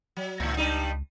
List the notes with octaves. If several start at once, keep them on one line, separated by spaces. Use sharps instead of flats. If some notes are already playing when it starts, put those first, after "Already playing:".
F#3
C#2 A2 D#3
G2 G3 D#4